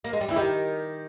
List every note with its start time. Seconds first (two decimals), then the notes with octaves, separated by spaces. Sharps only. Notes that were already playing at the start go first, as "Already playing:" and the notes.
0.04 A#3
0.13 G#3
0.21 G3
0.29 E3
0.31 E4
0.36 D#3 G4